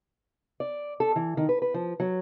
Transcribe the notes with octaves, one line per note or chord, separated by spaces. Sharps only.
D5
A4
E3
D#3
B4
B4
F3
F#3